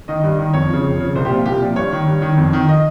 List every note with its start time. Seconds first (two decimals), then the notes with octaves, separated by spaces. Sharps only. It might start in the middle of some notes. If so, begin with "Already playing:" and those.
0.08 D#3 D#5
0.23 G2
0.39 D#3
0.53 F2 C#5
0.69 C#3 F3
0.84 F2
1.00 C#3 F3
1.15 C2 C5
1.25 G4
1.30 A#2 F3 F4
1.46 C2 G4
1.62 A#2 F3
1.76 G2 C#5
1.92 D#3
2.07 G2
2.22 D#3
2.38 F2
2.53 D#3
2.69 D#5